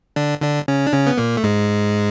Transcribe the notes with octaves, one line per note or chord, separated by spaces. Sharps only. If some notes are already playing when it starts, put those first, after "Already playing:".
D3 D4
D3 D4
C#3 C#4
D4
C#3 C#4
B3
A#2 A#3
A3
G#2 G#3